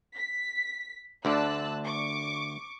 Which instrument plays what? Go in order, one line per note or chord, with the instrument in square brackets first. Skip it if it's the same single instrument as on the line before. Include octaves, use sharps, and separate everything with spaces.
[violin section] B6
[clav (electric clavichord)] D2 D3 D5 [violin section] A5 E6 F#6
[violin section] C#6 D6